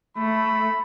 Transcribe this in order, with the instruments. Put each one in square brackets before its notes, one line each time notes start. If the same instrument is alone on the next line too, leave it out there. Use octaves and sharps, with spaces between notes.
[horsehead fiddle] A3 [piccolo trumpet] B5